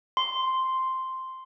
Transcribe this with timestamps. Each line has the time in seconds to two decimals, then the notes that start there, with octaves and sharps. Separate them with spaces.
0.17 C6